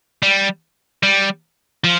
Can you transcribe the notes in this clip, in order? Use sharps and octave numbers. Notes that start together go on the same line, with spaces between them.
G3
G3
F3